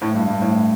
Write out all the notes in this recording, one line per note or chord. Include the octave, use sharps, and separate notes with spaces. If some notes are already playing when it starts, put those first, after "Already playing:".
A2
G2
G2
A2